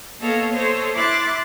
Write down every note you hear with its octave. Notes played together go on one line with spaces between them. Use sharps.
A#3 B3 A4 C#5 D#5 F5
A4 C5 C#5 D#5
E4 C6 D6 F#6 A6